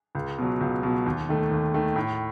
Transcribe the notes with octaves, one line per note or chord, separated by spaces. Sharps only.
C#2
B2 F#3
C#2
B2 F#3
D#2
D#3 A3
D#2
D#3 A3
A2